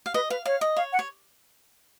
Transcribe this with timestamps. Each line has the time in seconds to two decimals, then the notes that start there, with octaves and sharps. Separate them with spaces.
0.06 F5
0.14 B4 D#5
0.30 B4 F5
0.46 C#5 F5
0.61 D#5
0.76 C#5 F5
0.93 F#5
0.99 C#5